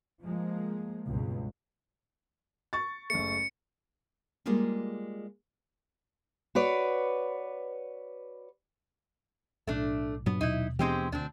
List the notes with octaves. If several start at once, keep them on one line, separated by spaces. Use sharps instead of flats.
F3 G#3 A#3
C#2 G2 B2
C#6 A6
F#1 A3 C#7
G3 G#3 A#3 F4 G#4
F#4 B4 C#5 D5
B1 A2 A3 D4
G2 A#2 F#3 B3 D4
D#2 B2 D#4 E4
E3 G#3 B3 C4 D4 G4
D2 C4 D4